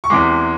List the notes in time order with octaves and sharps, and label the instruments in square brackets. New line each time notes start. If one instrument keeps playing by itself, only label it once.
[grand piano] C#6
E2 C3 E3 G#3 D6